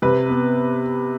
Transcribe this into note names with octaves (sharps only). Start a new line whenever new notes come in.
C3 B4
B3